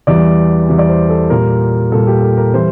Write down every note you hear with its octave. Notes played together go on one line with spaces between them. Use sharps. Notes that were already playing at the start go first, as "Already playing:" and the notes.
E2 E3 G3 D5
E2 E3 G3
D5
C5
A4
A#2 G3 A#4
A#2 G3 A4
G4
A4
A#4
E3 G3 C5